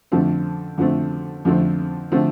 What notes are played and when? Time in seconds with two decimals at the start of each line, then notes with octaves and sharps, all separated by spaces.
0.12 F2 D3 F3 A3 C4
0.78 F2 D3 F3 A3 C4
1.45 F2 D3 F3 A3 C4
2.12 D3 F3 A3 C4